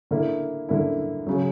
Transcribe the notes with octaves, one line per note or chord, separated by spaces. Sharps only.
D3 A#3 E4
D3 A#3 E4
C#3 F#3